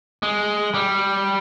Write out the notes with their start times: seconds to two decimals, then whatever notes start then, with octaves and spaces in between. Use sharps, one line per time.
0.23 G#3
0.74 G3